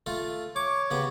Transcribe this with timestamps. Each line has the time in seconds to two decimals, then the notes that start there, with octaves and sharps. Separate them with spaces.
0.06 A3 F4 A4
0.56 C#5 D6
0.91 C#3 B3 G4